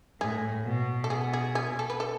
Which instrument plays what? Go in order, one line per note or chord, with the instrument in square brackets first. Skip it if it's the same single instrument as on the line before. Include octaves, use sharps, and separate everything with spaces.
[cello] A2 [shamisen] G#4
[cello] B2
[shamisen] A4
[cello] B2 [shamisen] G#4
[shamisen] G#4
G#4
A4
B4
A4